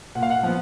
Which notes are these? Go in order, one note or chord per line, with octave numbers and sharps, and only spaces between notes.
A#2 F#5
F5
F#5
F3 B3